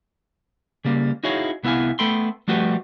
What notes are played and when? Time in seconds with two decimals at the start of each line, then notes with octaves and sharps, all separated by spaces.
0.85 C#3 G3 A#3
1.23 D#4 E4 F#4 G#4 C#5 F5
1.63 C2 B3 E4 F5 G#5
1.99 A3 B3 A4 G5 B5 C6
2.48 F3 G3 A3 F#4 G4 B4